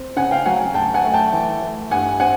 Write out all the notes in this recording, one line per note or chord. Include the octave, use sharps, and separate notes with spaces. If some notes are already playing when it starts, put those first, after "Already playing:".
Already playing: C4
C#3 F#5 G#5
F5 G5
F#3 F#5 G#5
D2 G5 A5
F#5 G#5
A3
G5 A5
E3
A3
G2 F#5 G#5
C4 F#5 G#5